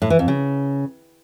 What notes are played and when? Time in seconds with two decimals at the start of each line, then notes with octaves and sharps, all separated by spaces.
0.02 A2
0.10 E3
0.19 F2
0.28 C#3